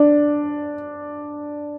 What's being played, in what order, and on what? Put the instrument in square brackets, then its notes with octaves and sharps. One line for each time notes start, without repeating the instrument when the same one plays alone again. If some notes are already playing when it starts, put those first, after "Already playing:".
Already playing: [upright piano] D4